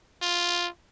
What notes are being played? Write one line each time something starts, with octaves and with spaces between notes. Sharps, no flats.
F4